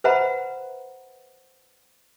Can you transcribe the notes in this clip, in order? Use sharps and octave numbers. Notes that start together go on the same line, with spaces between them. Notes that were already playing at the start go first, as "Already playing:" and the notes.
B4 C5 E5 F#5 A#5 B5